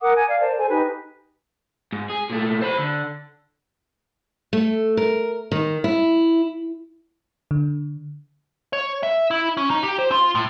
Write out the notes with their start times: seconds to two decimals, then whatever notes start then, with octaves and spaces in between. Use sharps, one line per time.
0.01 A#4 F#5 D6 D#6
0.16 G#5
0.28 D5 F5
0.41 A#4 C5 D5 A5
0.58 A4 C5 G#5
0.70 D#4 G4 B4 G#5
1.93 G#2
2.10 G#4
2.30 A#2 A3
2.62 C5 B5
2.78 D3
4.53 A3
4.97 A#4
5.52 D#3
5.84 E4
7.51 D3
8.73 C#5
9.03 E5
9.31 E4
9.57 C#4
9.70 D#4
9.83 G4
9.99 C5
10.12 F4
10.35 A2